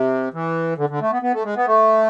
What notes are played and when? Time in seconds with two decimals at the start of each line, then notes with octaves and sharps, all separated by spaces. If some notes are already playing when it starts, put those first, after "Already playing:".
Already playing: C3
0.34 E3
0.78 D3
0.90 D3
1.01 A3
1.12 B3
1.22 B3
1.33 A3
1.45 G#3
1.56 B3
1.67 A3